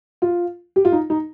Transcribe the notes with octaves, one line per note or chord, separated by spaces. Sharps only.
F4
G4
F4
D#4
D#4